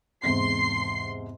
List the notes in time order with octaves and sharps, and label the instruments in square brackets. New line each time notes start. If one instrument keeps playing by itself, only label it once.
[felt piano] E2 G#2 C3 [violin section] C6 C7